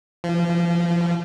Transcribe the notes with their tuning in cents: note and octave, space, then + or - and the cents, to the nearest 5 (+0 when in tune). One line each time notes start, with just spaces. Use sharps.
F3 -30